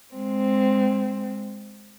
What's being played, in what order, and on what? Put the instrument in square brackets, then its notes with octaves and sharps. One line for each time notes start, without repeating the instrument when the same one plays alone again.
[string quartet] G#3 C4